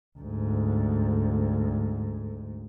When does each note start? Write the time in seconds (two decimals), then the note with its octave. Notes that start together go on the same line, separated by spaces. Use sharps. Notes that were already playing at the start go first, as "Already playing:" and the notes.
0.18 D2 G#2